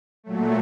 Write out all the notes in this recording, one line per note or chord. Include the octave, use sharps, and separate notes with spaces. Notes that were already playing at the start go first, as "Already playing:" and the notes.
A#2 F#3 A3